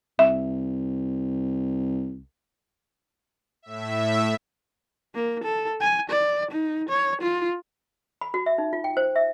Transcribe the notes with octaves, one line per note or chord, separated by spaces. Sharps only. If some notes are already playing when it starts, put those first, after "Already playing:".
C2 E5
A2 E5
A#3
A4
G#5
D5
D#4
C#5
F4
B5
F#4
E5
D#4
F4
G5
C5
E5